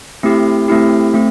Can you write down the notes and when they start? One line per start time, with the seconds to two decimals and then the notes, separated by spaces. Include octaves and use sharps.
0.23 A3 C4 E4 G4
0.68 A3 C4 E4 G4
1.14 A3 C4